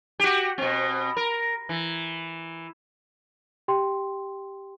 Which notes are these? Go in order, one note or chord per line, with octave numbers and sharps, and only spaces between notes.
F#4 G4
B2 C4
A#4
E3
G4 G5 C6